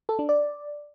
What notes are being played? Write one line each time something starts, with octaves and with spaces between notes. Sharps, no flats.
A4
D4
D5